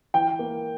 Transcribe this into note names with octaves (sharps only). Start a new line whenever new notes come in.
E3 G5
A#3